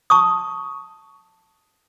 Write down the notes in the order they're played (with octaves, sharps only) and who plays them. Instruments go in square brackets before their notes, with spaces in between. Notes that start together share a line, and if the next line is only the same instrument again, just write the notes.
[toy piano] A5 C#6 D#6